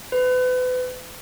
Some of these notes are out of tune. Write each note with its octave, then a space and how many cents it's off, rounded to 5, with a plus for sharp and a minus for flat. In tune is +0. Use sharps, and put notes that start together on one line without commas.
B4 +35